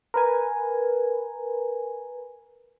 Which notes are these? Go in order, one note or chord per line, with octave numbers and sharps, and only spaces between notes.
A#4 B4 G#5